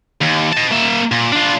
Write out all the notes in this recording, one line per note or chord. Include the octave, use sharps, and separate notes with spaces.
D#2
D#5 A5
A#3 E5
A#2
D4 F4